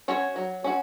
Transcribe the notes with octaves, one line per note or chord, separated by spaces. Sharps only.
C#4 F#4 C#5
F#3
C#4 F#4